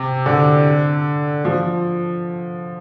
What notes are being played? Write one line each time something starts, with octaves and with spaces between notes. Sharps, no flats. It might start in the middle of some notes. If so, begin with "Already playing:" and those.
Already playing: C3
D3
F3